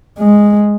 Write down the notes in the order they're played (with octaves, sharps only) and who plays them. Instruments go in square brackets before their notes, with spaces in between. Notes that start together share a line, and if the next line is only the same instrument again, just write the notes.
[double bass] G#3